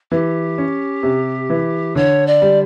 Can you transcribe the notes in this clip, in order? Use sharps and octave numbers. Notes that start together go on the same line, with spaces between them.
E3 G4
C#4
C3
E3
D3 C#5
D5
G3